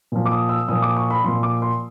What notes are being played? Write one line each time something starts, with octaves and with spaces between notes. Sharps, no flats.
A#2 F3
D6
D#6
E6
A#2 F3 D#6
D6
C#6
B5
A#2 F3 C6
D6
C6